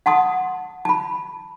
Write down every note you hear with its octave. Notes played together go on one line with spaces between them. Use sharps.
F#5 A5 C6 D#6
A5 B5